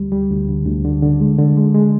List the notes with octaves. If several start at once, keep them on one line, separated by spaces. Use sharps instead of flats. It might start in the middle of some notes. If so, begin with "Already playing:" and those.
Already playing: D2 G3
G3
D2
D3
D2
D3
D3
G#3
D3
G#3
G#3